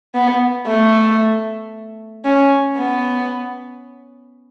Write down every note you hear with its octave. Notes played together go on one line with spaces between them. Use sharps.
B3
A3
C#4
B3